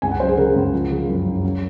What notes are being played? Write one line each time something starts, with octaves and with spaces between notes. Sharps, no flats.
C#2 G#5
F#5
F#3 C5
G#4
C#3 A#4
C#2
F3
C#3
F#2
F#1
F#3